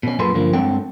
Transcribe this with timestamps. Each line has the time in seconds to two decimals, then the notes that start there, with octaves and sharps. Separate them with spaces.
0.03 B2 C#4
0.19 F#2 A#2 G#4 A4 B4 C6
0.34 G2 D3 F3 A#3
0.53 G2 G#3 C4 A4 C#5 G5